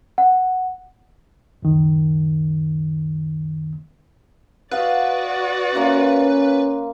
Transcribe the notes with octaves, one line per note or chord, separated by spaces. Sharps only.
F#5
C#2 F#2 D#3
F#4 B4 D5 D#5 F5 F#5
A#3 C#4 F4 E5